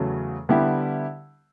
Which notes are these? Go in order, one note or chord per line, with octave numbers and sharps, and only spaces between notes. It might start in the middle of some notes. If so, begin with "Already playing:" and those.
Already playing: E2 C#3 F#3 A3
D3 G3 B3 E4 G4